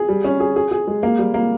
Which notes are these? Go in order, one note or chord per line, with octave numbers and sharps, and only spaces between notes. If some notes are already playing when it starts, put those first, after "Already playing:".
Already playing: G#4
G3
C#4
G#4
G#4
G#4
G#3
A#3
G3
A#3